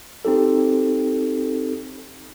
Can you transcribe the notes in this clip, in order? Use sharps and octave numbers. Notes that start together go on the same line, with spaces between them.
C4 D#4 G4 A4